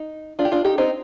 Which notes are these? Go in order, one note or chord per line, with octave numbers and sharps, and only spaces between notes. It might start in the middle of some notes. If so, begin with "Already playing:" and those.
Already playing: D#4
D4 F4
G4
D4 F4
D#4 G4
C4 D#4